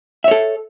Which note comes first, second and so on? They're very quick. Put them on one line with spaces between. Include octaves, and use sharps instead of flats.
E5 C#5 A4